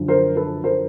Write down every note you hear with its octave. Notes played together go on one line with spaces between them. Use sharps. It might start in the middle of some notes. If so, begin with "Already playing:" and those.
Already playing: F#2 D3 F3
A#4 C5
A4 B4
A#4 C5